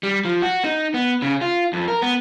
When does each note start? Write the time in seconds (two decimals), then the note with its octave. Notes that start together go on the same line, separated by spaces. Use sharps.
0.03 G3
0.25 F3
0.42 F#4
0.64 D#4
0.94 B3
1.22 C#3
1.41 F4
1.73 F2
1.88 A#4
2.02 B3